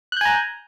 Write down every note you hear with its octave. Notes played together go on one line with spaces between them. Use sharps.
G#5 A#5 F#6 G6